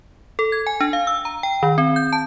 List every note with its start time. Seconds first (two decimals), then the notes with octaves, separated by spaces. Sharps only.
0.39 A4
0.52 G#6
0.67 G#5
0.81 D4
0.93 F5
1.07 E6
1.25 A#5
1.43 G5
1.63 D#3
1.78 C4
1.96 G6
2.13 A5